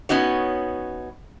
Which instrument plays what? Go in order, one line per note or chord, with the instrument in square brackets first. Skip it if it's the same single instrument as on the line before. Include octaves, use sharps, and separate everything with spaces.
[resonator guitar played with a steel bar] B3 C#4 D#4 F#4 C#5